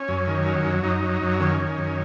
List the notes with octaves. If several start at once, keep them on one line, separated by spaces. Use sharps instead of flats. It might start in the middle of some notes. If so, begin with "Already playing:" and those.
Already playing: C#4
F#2
D#3
F#3
F#2
F#2 D#4
F#3
F#2
D#3 C#4
D#3
F#2